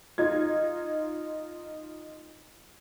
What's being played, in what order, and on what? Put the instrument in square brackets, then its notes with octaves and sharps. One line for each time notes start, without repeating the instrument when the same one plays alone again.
[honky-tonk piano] D#4 F4 G#6